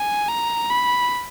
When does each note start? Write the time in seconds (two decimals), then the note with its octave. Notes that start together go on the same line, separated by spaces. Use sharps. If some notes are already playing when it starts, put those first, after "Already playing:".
Already playing: G#5
0.28 A#5
0.70 B5